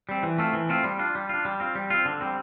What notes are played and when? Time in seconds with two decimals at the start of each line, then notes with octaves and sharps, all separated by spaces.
0.09 G3 C4
0.23 E3
0.38 A3 C4 F4
0.54 E3
0.69 A3 C4 F4
0.84 G3
0.99 D4 F4
1.15 G3
1.29 D4 F4
1.45 G3
1.60 C4 F4
1.75 G3
1.90 C4 F4
2.05 D3
2.21 G3 C4